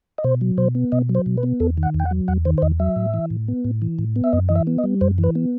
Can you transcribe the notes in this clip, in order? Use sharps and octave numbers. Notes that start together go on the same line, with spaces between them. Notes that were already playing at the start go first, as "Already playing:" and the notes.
D#5
B2 C5
F#3
B2 C5
B3
B2 D#5
F#3
C5
B2
B4
B3
E2 A4
D#3
F#5
E2
G5
F#5
F#3
E2 F#5
D#3 C5
C5
E2 D#5
F#3 E5
A2
E3
A2
B3
A2
E3
A2
B3
E5
F#2 D#5
E3 D#5
E5
B3
D#5
G3
F#2 C5
E3
B4
B3